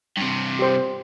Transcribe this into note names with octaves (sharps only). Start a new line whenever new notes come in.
G2 C3
G4 C5